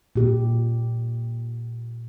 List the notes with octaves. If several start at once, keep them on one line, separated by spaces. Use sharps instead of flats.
A#2 G4